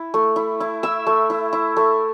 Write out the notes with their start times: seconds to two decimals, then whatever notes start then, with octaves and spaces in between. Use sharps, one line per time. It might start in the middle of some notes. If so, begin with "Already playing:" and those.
Already playing: E4
0.14 A3
0.36 E4
0.60 E4
0.83 E4 E5 E6
1.07 A3
1.30 E4
1.53 E4
1.77 A3